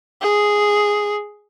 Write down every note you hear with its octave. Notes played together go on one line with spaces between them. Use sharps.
G#4